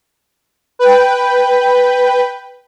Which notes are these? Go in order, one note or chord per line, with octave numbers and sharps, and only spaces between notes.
B4 G5